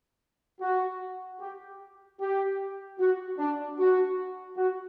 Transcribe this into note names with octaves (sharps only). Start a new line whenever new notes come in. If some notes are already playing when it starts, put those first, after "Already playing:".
F#4
G4
G4
F#4
D4
F#4
F#4